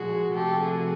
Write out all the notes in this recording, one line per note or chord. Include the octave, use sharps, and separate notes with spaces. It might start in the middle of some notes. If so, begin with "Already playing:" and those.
Already playing: A#2 F3 G#3 F#4 G#4
C3 F3 A3 G4 A4
F#4 G#4